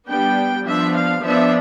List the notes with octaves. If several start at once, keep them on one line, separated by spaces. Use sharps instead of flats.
G3 B3 D4 G5
F3 B3 D4 E5
F5
F3 B3 D4 E5